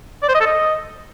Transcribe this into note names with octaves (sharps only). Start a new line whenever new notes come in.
D5
C5
D#5
A4
D#5